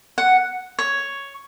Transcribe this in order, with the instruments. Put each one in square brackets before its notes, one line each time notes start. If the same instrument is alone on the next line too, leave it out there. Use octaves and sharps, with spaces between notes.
[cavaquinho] F#5
C#5